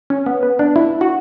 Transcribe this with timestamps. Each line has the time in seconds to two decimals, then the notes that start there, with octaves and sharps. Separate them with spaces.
0.10 C#4
0.26 B3
0.43 B3
0.59 D4
0.76 E4
1.01 F#4